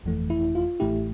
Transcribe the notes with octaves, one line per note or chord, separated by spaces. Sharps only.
G1 F2 E3 A3
E4
F4
A1 A2 E3 A3 E4 G4